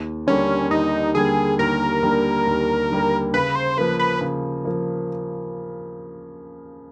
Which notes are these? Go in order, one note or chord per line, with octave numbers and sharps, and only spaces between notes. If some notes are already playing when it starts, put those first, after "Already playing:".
Already playing: D#2
D3 G3 A#3 C#4
D#2 D#4
D3 G3 A#3 G#4
D#2 A#4
D3 G3 A#3
D#2
D3 G3 A#3
C#3 B4
C5
F3 A#3 B4
B4
C#3
F3 A#3